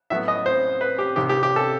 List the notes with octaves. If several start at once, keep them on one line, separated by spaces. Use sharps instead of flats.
A2 F#3 B3 E5
D#5
C5
B4
G4
C2 C3 D#3 G4
G4
G4
A4